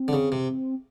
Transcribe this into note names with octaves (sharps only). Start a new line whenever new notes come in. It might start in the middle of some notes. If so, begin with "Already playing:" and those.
Already playing: C4
D3
C#3
C3